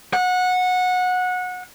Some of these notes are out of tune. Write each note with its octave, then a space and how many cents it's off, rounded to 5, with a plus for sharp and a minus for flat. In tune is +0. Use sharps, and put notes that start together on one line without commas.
F#5 -20